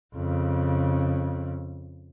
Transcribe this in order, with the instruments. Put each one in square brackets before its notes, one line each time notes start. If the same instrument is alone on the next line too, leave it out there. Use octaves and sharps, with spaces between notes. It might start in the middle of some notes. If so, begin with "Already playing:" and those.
[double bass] F2 C#3